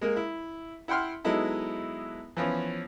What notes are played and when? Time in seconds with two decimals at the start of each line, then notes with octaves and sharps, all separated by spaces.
0.01 G#3 A#3 A#4
0.16 E4
0.88 E4 F#5 G5 C6 F6
1.24 F#3 G#3 B3 D#4 E4 A4
2.37 E3 F3 B3 C#4